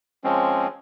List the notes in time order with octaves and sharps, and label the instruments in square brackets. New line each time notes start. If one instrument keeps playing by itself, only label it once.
[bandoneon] F3 G#3 C4 C#4